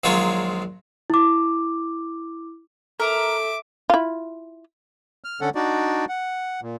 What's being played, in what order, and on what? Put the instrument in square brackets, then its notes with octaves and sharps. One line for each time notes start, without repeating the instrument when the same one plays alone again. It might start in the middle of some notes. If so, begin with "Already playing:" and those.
[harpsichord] A#1 D#3 F#3 G#3 F4 C#5
[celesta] E4 D6
[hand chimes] A4 [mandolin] A#4 [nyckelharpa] E5 [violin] D6
[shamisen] E4 F4
[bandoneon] F6
D3 C#4 A4 F#5
D4 D#4 F#4 D5
F#5
A#2